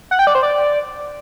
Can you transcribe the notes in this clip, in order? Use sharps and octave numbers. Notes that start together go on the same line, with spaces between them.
F#5
G5
D5
C5
D5